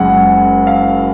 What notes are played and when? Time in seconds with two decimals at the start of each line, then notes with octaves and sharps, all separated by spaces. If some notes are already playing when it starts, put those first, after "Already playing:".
Already playing: F#1 F#2 C#3 G#3 F#5
0.67 F5